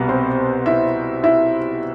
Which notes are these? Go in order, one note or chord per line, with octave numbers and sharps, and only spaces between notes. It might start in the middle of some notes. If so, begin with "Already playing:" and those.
Already playing: C2 B2 G3 B3 B4
C4 C5
E4 E5
E4 E5